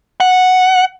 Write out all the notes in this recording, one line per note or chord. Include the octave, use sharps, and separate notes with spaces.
F#5